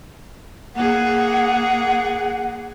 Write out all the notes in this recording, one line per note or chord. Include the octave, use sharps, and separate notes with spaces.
A#3 G#4 F#5